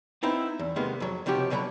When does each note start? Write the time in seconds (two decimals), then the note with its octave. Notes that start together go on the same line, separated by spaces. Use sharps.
0.23 B3 C4 D#4 E4
0.59 E2
0.76 C3 D#3 G#3 A#3 B3
1.00 F2 F#3
1.26 C#2 C3 F3 F#4 G4
1.50 B2 D3 F#3 F5 A#5 B5